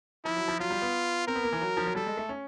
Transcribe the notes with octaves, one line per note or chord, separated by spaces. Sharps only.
F3 E4
F#3
F3
F#3 F4
G3
B3
C4 A#4
B3
A#3
E3
F#3
F3
F#3
G3 A4
G#3
A3
C#4